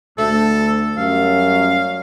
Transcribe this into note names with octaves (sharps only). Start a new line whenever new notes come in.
D2 A3 A4
F#2 G3 F5